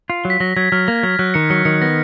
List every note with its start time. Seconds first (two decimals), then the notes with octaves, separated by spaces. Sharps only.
0.10 F4
0.25 F#3
0.30 B6
0.40 F#3 A#6
0.56 F#3 G#6
0.72 F#3 F6
0.88 A#3 A#6
1.03 F#3 G#6
1.19 F#3 F#6
1.34 D#3 C#7
1.50 F#3 C#7
1.65 D#3 C#7
1.81 B3 A#6